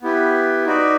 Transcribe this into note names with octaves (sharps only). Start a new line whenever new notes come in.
B3 E4 G4 B4
D#4 F#4 B4 D5